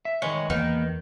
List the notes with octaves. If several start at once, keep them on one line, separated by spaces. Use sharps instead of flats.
E5
D#3 G#3 B4 C#5
E2 D#3 A#3 B4